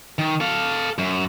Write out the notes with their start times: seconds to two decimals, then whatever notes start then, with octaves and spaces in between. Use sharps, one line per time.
0.19 D#3
0.40 A4 F5
0.98 F#2